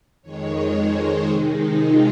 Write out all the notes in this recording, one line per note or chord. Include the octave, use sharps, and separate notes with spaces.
F2 D#3 G#3 C#5
C5
C3 D#3 G#3 D#4
F4